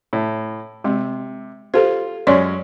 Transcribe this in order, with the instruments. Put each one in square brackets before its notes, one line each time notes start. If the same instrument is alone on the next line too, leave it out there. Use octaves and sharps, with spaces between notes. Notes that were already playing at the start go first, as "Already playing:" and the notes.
[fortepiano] A2
[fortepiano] C3 [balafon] G#3
[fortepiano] F4 [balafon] G4 A4 C5
[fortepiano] F#2 G#3 C#4 [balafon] C#5 D5 C6